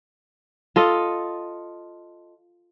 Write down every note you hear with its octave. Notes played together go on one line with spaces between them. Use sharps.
F4 A4 D#5